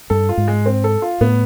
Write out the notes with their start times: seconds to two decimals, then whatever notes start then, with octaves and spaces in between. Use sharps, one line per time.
0.10 G2 A4
0.29 F4
0.38 G#2
0.48 G#3
0.66 C4
0.84 A4
1.02 F4
1.21 A2 B3